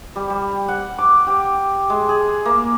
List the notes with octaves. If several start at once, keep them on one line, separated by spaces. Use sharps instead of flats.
G3
G3
F#5
D6
G4
G#3
G#4
A#3